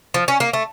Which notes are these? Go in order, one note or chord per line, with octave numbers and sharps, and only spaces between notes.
F3
C#4
A#3
A3